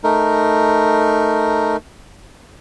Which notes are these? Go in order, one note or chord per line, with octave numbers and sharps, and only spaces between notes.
A3 D#4 A#4